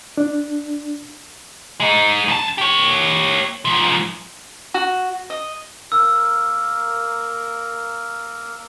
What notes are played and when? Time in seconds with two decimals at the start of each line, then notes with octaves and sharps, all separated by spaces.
0.17 D4
1.80 G#3 D#4
2.28 F#2 A5
2.58 G4 C#5
3.65 G#2 F3
4.74 F#4
5.30 D#5
5.92 A#3 A#4 E6